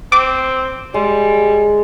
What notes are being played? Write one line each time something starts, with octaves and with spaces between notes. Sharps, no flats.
C4 D6
G3 G#3